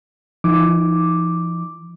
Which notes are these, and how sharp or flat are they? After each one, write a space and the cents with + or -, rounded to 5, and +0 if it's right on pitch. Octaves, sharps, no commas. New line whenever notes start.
F3 -45 D#4 +10 D6 +0